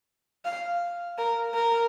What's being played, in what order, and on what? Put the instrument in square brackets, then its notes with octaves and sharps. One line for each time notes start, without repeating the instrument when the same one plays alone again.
[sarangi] F5
A#4
A#4